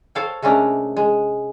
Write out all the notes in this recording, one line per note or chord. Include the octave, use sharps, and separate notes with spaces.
A4 C5 C#5 F5 G5
C3 G#3 A3 C#4 D4 A#4
G#3